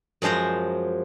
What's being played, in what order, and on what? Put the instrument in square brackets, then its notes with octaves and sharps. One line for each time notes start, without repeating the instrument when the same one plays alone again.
[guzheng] F#2 F3 G#3 C5 A#5